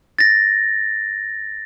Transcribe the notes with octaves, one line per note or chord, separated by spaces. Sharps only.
A6 A#6